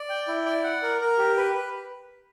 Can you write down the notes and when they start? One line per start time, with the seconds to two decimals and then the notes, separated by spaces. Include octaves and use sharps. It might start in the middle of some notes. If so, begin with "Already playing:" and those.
Already playing: D5
0.10 G5
0.28 E4
0.46 D5
0.64 F#5
0.83 A#4
1.01 A#4
1.18 G4
1.37 B4
1.54 B4